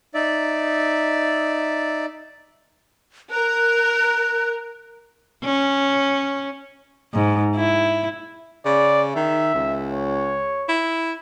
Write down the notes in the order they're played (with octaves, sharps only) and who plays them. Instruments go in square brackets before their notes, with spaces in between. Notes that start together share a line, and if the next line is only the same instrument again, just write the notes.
[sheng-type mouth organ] D#4 D5 E5
[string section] A#4 [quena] F#6
[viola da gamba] C#4
G#2
E4
[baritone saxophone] C#3 [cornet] D5
[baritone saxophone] D#3 [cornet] E5
[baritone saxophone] C#2
[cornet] C#5
[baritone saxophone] E4